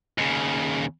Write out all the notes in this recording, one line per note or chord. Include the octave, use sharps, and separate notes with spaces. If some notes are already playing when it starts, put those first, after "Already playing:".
D#2 C#3